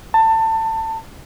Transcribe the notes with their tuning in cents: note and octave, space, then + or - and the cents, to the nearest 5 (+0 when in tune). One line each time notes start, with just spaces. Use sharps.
A5 +25